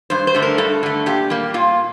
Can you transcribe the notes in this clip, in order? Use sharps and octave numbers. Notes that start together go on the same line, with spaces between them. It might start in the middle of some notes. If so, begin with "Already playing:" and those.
G2 C5
C5
D3 A3
A#4
G2 A4
D3 A3
A#2 G4
G3 A#3
A#2 F4